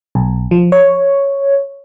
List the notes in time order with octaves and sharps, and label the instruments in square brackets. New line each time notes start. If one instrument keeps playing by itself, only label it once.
[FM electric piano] B1
F3
C#5